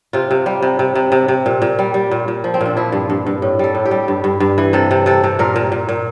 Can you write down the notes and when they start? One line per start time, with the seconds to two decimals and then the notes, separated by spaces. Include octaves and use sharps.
0.13 C3 F4
0.31 C3
0.46 G3
0.63 C3
0.79 C3
0.95 C3
1.12 C3
1.28 C3
1.46 A#2
1.62 A#2
1.79 G3
1.94 G3
2.11 A#2
2.28 A#2
2.44 F3
2.54 C4
2.61 A#2
2.66 D4
2.77 F3 E4
2.92 G2
3.10 G2
3.26 G2
3.42 A2
3.59 G3 A4
3.75 A2
3.86 G4
3.91 G3
4.08 G2
4.24 G2
4.40 G2
4.58 E3
4.73 C3 A4
4.91 C3
5.06 C3 A4
5.24 C3
5.39 A#2 A#4
5.56 A#2
5.72 A#2
5.89 A#2